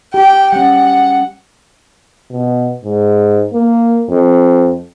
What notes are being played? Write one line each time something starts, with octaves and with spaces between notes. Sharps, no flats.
G4 G5
G3 C#4 F#5
B2
G#2
A#3
F2